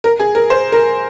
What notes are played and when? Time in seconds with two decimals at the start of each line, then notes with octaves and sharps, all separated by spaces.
0.04 A#4
0.20 G#4
0.35 A#4
0.50 C5
0.72 A#4